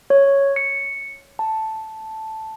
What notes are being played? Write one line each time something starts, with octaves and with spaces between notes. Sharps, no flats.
C#5
C#7
A5